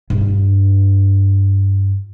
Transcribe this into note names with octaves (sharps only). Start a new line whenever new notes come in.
G2 F4